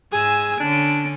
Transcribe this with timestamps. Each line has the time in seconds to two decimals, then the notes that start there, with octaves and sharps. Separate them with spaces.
0.12 G#2 G#4 G#5 E6
0.60 D3 C#4 D4 D7